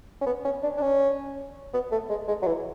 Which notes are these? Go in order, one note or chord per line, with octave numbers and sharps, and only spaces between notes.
C#4
B3
C#4
D4
D4
C#4
B3
A3
G#3
G#3
F#3
E3